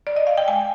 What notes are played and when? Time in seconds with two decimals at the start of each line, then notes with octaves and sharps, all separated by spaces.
0.07 D5
0.17 D#5
0.27 F5
0.37 G5
0.48 G#3 G#5